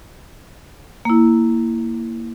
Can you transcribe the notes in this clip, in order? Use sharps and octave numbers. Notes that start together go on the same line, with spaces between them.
A#3 E4